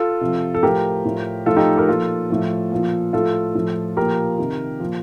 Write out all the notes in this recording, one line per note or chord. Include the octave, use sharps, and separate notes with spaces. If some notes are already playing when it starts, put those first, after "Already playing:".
Already playing: F4 A4
C3 F3
A4
A2 F3 G4 A#4
A2 F3
A2 F3 F4 A4
D#4 G4
G4 A#4
A#2 F3 F4 A4
A2 F3
A#2 F3
A2 F3 F4 A4
A2 F3
A#2 F3 G4 A#4
C3 D#3
A#2 F3